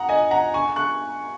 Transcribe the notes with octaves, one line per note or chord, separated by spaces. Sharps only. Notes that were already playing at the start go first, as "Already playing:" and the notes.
Already playing: F#5 A#5 D#6 F#6
D#5 G#5
F#5 A#5
G#5 C#6
C#6 F#6